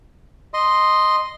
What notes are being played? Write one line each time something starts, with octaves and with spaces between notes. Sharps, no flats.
D#5 C6